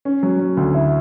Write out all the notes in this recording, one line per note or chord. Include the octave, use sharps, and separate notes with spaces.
C#4
F#3
C#4
D2
E4